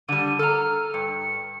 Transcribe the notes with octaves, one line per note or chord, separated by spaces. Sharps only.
D3 G3 D#7
A4 A#5 F6
G2 C#7